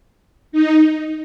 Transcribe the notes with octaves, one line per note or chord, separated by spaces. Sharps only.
D#4